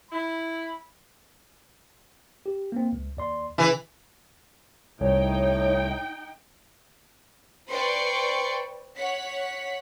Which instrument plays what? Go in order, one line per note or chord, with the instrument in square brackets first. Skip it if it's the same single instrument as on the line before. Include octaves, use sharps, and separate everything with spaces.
[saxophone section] E4 [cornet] B5
[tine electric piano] G4
A#3 C4
C#2
D#2 D5 C6
[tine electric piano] C#3 [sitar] E3
[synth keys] C2 [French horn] A2 [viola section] D#4 G5 [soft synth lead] C#5
[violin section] B4 C5 D5 G5 C6 C#6
C#5 F#5 B6